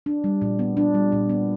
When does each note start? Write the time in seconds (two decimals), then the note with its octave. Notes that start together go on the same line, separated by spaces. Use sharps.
0.06 D4
0.24 G3
0.42 A#2
0.59 B3
0.77 D4
0.94 G3
1.12 A#2
1.30 B3